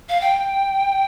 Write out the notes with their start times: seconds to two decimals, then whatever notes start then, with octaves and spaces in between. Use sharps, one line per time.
0.09 F5
0.21 G5